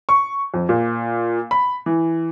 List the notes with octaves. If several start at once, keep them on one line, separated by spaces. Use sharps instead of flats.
C#6
F2
A#2
B5
E3